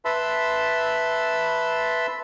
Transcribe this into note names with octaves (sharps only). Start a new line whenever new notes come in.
B4 E5 A5 B5 C6 E6